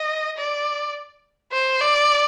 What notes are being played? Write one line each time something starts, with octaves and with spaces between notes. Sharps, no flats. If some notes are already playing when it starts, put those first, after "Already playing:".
Already playing: D#5
D5
C5
D5